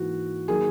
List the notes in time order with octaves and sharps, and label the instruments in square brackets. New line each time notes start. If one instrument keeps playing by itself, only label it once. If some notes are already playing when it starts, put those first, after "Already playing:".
Already playing: [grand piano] G#2 E3 A#3 [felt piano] F#4
[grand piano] D#3 F#3 A#3 D#4 [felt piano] G#4